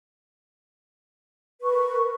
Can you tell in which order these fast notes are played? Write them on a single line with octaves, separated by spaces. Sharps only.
B4 C#6 A#4